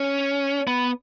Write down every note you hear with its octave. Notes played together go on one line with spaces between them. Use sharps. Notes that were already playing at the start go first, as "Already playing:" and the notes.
Already playing: C#4
B3